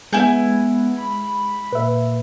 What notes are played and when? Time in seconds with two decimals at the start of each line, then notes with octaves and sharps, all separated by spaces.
0.13 G#3 B3 E4 G#5 G6
0.97 B5
1.73 A#2 B4 E5